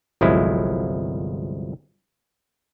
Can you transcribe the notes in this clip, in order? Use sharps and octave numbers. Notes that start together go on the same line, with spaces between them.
G1 C2 F3 F#3 G#3 E4